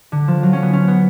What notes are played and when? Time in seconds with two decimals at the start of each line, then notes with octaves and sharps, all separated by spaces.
0.12 D3
0.28 F3
0.43 F#3
0.53 C#4
0.62 B3
0.73 C#4
0.88 B3